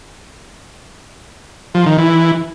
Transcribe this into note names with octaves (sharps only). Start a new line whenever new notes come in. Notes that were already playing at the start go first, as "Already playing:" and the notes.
F3
D#3
E3